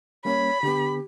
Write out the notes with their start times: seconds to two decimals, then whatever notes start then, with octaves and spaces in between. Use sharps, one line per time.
0.25 G3 A#3 C#4 C#5 B5
0.63 D3 B3 G4